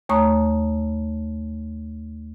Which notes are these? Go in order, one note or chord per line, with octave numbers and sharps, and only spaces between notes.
D#2 A3 C#5 A#5 C#6 D#6